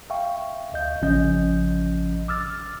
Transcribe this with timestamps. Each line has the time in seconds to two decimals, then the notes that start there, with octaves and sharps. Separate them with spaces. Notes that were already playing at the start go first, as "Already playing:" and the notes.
0.10 E5 F5 G5 C#6
0.73 D2 D#5 F5 G6
1.02 A1 C#3 F3 C#4 D#5 G6
2.28 D6 E6 F6 A6